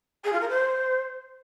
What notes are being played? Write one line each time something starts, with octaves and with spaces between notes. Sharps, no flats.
G#4
F4
A#4
C5